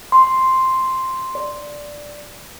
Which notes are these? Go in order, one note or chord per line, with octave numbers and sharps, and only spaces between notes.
C6
D5